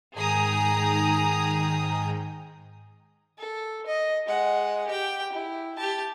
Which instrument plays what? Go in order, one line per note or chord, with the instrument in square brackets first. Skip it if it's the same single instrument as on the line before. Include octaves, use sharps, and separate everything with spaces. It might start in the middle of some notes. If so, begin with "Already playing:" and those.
[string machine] G#2 D#3 G5 [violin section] G#4 A#5 D#6
[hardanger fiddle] A4
D#5
G#3 F#5
G4 G5
E4
G4 A5